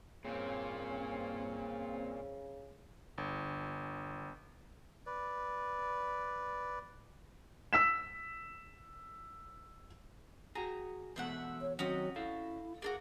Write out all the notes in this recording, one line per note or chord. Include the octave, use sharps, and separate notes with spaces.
G2 A#2 C#3 A#3 C4 C#4
G1
B4 D5
E6 B6 E7
F#4 G#4 A#5
E2 B2 A3 C4 E5 F#5
C#5
D#3 F#3 C4 C#4 F#4 D#6
E4 A4 F5
A#3 D4 F#4 G#4